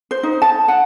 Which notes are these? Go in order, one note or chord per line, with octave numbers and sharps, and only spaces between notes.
C5
D#4
A5
F#5